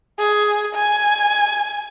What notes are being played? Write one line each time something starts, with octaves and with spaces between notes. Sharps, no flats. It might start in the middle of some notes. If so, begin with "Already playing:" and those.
G#4
G#5